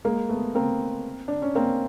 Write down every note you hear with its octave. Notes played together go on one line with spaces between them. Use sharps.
G#3 A#3
A3 B3
A#3 C4
D4
C#4
A#3 C4